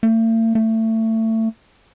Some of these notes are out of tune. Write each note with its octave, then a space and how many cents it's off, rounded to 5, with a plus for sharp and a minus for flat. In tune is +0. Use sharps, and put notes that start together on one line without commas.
A3 +45
A3 +25